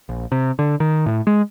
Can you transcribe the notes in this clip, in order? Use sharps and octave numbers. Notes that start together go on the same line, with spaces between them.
A#1
C3
D3
D#3
A2
G#3